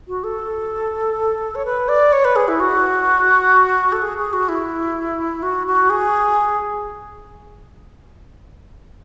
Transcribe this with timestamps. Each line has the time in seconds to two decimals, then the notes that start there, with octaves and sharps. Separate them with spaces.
0.08 F#4
0.24 A4
1.55 C#5
1.65 B4
1.89 D5
2.13 C#5
2.25 B4
2.36 G#4
2.48 E4
2.60 F#4
3.92 A4
4.02 G#4
4.18 G#4
4.33 F#4
4.49 E4
5.43 F#4
5.67 F#4
5.90 G#4